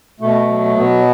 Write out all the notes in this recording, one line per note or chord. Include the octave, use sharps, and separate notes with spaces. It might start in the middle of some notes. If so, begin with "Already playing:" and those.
B2 A3
F#3
B2 B3